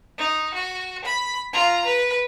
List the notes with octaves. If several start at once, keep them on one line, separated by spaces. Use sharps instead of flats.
D#4
F#4
B5
F4 A#5
B4